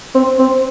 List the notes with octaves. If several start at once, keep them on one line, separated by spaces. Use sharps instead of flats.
C4
C4